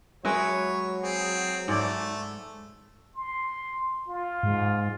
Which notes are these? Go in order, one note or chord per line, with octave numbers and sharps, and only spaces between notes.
F#3 G#3 B4 C#5 E5
C4 G#4
G#2 A3 D5
C6
F4
G#2